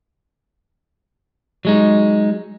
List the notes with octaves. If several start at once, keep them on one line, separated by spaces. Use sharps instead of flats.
F#3 G#3 D#4